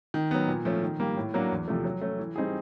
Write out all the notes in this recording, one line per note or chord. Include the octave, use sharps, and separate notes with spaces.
D#3
F#3 B3
A#2
F3 A3 C#4
D#3
G3 A#3
A2
F#3 A#3 D4 F#4
E2
C3 F3 A3
F#3
A3 C#4
E3
G3 C4 D#4 G#4